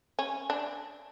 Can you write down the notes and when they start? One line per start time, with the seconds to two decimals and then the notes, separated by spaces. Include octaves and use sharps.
0.19 C#4
0.50 D4